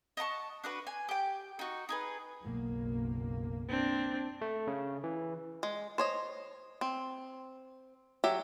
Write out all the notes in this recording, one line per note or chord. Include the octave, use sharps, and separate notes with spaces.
D#5 F#5 A5 C#6
D4 F#4 B4
G#5
G4 G5
D#4 F#4
D#4 G#4 B4
F#1 B1 A#3
C4 D4
A3
C#3
E3
G#3
C5 C#5 D#5
C4
F#3 G4 E5